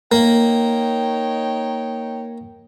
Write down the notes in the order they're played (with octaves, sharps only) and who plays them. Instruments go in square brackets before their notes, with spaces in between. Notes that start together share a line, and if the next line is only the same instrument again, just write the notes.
[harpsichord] A#3 [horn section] D#4 C#5 G5